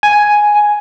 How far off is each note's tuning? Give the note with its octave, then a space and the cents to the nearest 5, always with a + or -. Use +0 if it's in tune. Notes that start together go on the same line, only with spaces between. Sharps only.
G#5 +5